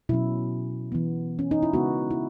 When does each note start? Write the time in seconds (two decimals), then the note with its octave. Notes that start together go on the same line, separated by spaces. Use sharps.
0.09 B2 F#3 C#4 E4
0.92 E3 B3
1.39 C#4
1.51 D#4
1.63 E4
1.73 C#3 G#3 B3 F#4
2.11 E4